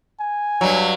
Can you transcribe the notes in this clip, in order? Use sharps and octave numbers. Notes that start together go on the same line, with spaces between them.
G#5
G2 F#3